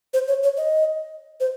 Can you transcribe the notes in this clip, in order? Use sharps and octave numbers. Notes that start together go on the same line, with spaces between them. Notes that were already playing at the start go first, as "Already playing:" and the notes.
C5
C#5
C#5
D#5
C5